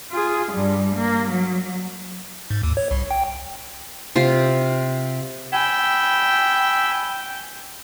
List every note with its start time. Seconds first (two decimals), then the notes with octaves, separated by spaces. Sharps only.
0.12 F4 G#4
0.52 G2 G3
0.96 A#3
1.30 F#3
2.51 G#2
2.63 D#2
2.77 C#5
2.91 C2
3.11 G5
4.16 C3 F4
5.53 G5 G#5 B5 E6